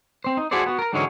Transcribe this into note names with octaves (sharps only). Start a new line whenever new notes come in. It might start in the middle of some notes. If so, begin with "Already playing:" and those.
C4 C5
D#4
E4 F#4 G#4 A4 C5 D5
B3 F#4
A#4 A#5
G#2 D3 E3 F#3 G#3 C#4